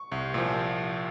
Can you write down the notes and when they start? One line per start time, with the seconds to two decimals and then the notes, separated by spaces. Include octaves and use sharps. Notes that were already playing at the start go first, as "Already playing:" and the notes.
Already playing: C#6
0.12 C2
0.34 A#2 F3